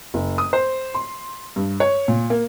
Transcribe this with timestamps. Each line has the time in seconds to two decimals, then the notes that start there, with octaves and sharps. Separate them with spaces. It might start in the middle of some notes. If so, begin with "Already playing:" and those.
0.14 F#1
0.38 D#6
0.53 C5
0.95 C6
1.56 G2
1.80 C#5
2.08 A#2
2.30 A#3